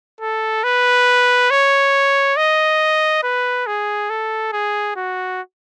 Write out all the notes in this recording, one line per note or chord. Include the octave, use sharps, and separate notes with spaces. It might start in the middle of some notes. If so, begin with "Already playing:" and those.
A4
B4
C#5
D#5
B4
G#4
A4
G#4
F#4